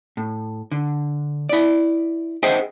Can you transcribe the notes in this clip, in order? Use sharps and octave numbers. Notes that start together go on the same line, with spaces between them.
A2
D3
E4 D5
G#4 C5 D#5 E5 F#5 G5